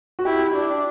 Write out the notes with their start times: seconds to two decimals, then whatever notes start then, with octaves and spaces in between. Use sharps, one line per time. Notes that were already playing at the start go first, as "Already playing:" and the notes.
0.19 F#4
0.25 E4 G4
0.54 D4